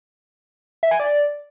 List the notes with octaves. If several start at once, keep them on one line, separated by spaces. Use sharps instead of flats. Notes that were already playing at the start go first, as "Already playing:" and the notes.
E5
G#5
D5